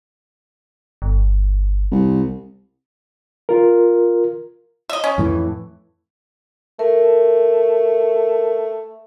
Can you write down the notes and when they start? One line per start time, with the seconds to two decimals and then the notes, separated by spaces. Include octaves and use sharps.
1.02 G1
1.91 C2
3.49 F4 A#4
4.89 D#5 E5
5.04 C#4
5.18 F2 A2 E3
6.79 A3 A#4